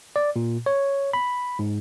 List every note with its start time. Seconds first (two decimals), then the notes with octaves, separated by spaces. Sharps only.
0.16 D5
0.36 A#2
0.66 C#5
1.13 B5
1.59 G#2